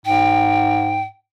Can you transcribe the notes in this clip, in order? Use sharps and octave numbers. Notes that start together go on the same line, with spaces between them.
G#2 G5